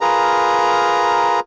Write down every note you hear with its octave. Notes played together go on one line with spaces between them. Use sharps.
F4 G#4 A#4 B4 A#5